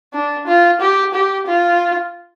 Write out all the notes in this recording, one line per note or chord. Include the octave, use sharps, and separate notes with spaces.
D4
F4
G4
G4
F4